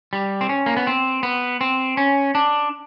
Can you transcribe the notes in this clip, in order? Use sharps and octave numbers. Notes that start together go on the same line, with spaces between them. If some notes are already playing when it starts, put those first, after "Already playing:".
G3
C4
C#4
A#3
B3
C4
B3
C4
C#4
D4